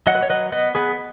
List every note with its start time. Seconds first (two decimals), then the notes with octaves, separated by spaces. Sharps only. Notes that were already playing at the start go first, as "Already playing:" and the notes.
0.07 F#3 D#5 F#5
0.15 B4
0.23 C#5
0.30 F#3 B4 D#5
0.52 B3 B4 D#5
0.75 B3 G#4 B4